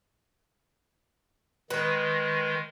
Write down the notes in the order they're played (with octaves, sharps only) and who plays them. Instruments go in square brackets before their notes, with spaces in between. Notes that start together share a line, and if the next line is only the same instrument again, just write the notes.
[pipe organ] D#3 G#3 [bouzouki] B4